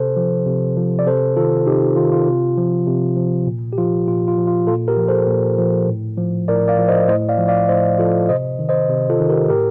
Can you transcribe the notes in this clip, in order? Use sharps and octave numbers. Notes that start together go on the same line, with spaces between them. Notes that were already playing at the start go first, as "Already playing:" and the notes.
Already playing: C3 A4 C5
F3
C3
F3
D5
C3 A4 C5
D#3 F4 A4
C3 D#4 G4
D#3 F4
F4
C3
F3
C3
F3
A#2
G4
F3 F4
A#2 F4
F4
F3
F4
A#2 F4 A4
G4 A#4
F3
A4 C5
A#2
F3
A2
F3
A2 A#4 D5
D5 F5
F3
C5 D#5
A2 C5 D#5
D5 F5
F3
D5 F5
A2 C5 D#5
F3 F4 A4
C3 C5 D#5
D#3
C5 D#5
C3
F4 A4
D#3
G4 A#4
A2 G4 A#4